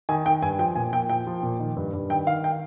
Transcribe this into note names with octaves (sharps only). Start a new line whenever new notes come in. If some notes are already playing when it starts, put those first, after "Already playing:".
D#3 G#5
D#3 G5
G2 G#5
F3 G5
A#2 G#5
A#2 G5
F3 G5
F3
A#2
D#3
G2
G2
D#3 G5
D#3 F5
G5